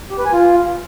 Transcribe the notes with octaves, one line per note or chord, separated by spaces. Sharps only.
G4
B4
G#5
F4